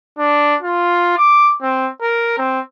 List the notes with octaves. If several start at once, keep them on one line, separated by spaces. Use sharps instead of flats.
D4
F4
D6
C4
A#4
C4